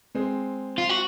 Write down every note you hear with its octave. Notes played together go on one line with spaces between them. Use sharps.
G#3 C4
F4
F#4